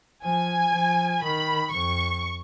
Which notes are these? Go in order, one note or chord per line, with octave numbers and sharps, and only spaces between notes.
F3 G#5
F3
D#3 B5
F2 C#6